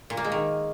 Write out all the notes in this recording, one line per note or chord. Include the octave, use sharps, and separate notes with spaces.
A#2
A#3
G#3
D#3